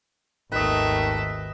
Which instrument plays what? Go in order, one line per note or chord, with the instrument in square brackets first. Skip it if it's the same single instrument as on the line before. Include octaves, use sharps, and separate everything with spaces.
[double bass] G#1 D#2 [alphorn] D#3 [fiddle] A3 E5 [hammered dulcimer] B4 D#5